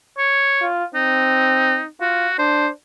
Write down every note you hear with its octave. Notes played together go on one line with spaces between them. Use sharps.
C#5
F4
C4 D#4
F4 F#4
D4 C5